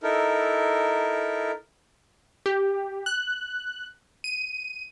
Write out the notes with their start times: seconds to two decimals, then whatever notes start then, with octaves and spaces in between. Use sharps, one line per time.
0.03 D#4 E4 A4 A#4
2.46 G4
3.06 F#6
4.24 D#7